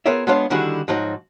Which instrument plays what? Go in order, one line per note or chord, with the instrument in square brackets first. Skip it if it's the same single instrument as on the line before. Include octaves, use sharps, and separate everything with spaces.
[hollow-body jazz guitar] B3 F4 G#4 A#4 C#5 E5
G#3 B3 D4 F4 C#5 F5
D3 D#3 G3 E4 F#4 G#4
G#2 F3 F#3 D#4 F#4